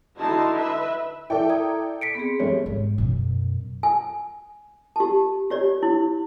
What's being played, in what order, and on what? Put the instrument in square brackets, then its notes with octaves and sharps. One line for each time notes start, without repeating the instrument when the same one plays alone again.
[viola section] D3 D#4 E4 F#4 A5 C6
B4 E5
[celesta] E4 E5 [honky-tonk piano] A4 D5 G5
[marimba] A#5 D#6 G#6
[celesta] B6 C#7 D7
[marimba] B3 C4 G#4
[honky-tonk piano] G2 G3 A3 [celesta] C#5
[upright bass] G#2
F#2 B2
[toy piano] G#5
G4 A5
G4 C#5 D5
E4